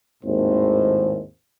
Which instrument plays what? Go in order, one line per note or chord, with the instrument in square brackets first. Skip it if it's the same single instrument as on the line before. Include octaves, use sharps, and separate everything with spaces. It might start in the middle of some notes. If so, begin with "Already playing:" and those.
[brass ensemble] G#1 D#2 A2 C5